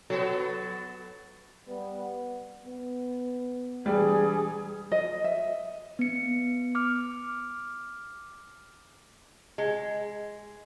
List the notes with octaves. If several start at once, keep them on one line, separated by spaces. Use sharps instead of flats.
F#3 B3 F#4 A4
G3 B3
B3
E1 G3 G#4 D5
D#5
E5
B3 C#7
D6 F6
G#3